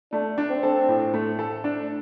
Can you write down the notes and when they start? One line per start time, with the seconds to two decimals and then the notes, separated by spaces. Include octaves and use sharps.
0.12 A3 D4
0.38 D4
0.50 C4
0.63 A4
0.89 A2
1.14 A3
1.39 A4
1.64 D4